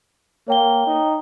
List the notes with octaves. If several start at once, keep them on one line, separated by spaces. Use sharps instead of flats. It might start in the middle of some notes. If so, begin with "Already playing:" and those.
A#3 C#5 G5 G7
D#4